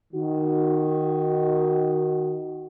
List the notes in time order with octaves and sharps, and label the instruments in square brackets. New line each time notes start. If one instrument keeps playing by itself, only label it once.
[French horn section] D#3 F#4